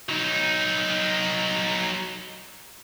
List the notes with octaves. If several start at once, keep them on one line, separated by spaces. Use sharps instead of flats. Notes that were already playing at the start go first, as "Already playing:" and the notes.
F#3 D#4